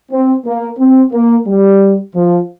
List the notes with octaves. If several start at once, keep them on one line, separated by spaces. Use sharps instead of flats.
C4
A#3
C4
A#3
G3
F3